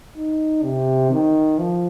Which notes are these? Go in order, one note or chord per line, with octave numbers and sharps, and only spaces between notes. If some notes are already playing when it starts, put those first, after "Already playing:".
D#4
C3
D#3
F3